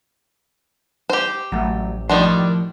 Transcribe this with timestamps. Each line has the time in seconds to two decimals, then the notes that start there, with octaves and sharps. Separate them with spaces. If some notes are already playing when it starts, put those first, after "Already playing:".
1.10 G4 C5
1.52 A1 F#3 A3
2.09 A2 D#3 F3 G3 D4 C6